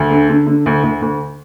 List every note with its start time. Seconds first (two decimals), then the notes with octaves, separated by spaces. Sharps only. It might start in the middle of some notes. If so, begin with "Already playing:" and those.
Already playing: D2
0.11 D3
0.29 D3
0.47 D3
0.66 D2
0.84 D2
1.02 D2